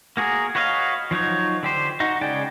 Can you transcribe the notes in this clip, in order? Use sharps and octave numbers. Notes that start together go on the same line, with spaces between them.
A#3 F#4 G#4 A#4
F#4 B4 C#5 D#5 F5
F3 F#3 D#4 C#5
D3 G4 C5
D#4 F#4
C#3 G#3 D5 G5